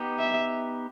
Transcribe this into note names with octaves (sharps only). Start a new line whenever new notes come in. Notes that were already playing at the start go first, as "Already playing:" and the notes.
Already playing: B3 D#4 G4
E5